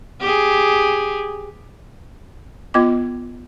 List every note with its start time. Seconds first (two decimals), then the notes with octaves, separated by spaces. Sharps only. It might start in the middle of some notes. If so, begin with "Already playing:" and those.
0.21 G4 G#4
2.74 B3 F4 D#5 D6